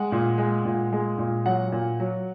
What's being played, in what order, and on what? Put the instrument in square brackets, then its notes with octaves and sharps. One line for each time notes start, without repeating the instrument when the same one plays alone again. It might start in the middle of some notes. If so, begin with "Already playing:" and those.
Already playing: [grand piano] G#3 F#5
A#2
G#3
A#2
G#3
A#2
F#3 F#5
A#2
F#3